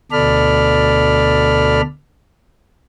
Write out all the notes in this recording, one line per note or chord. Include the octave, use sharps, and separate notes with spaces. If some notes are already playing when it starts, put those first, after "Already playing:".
D2 B2 A4 D5 B5 F6